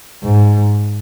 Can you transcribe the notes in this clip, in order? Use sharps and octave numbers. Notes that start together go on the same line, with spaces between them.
G#2